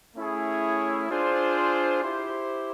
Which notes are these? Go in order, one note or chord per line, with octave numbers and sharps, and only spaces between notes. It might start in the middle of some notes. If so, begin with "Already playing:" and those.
A3 C#4 E4 G#4 C#5
D4 F4 G#4 C5
E4 G4 C5